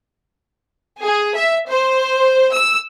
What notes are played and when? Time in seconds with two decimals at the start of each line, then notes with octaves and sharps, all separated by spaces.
1.01 G#4
1.35 E5
1.68 C5
2.53 E6